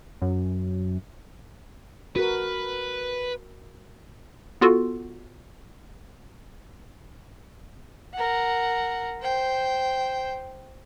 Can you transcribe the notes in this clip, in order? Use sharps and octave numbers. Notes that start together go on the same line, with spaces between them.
F#2
F#4 A#4 B4
B3 F4 F#4 A4
A#4 F#5
C5 G5